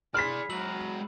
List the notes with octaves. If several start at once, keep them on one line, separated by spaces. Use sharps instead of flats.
E4 G#4 D5 B5 C6 F6 B6 C7
F#3 G#3 F#4 A#5 E6 F#7